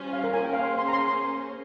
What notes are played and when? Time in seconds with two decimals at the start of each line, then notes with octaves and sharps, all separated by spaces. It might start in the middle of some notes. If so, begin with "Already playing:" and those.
Already playing: G3 C#4 F4 C5
0.13 F5
0.24 A#4
0.33 A#3 C#4 G#4 C5 G#5
0.44 G5
0.53 F5
0.63 C6
0.79 C6
0.88 A#5
0.93 C6
1.08 C6